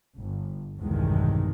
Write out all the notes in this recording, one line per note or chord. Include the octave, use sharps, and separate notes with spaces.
G1
B1 E2 G2 C3 D#3 G#3